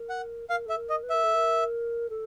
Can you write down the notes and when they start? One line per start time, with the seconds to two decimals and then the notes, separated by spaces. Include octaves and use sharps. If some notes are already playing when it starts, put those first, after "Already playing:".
Already playing: A#4
0.10 F#5
0.49 A#4 F5
0.65 A4 E5
0.76 A#4
0.90 D#5
1.03 B4
1.10 A#4 E5
1.23 A4
1.34 A#4
2.09 A4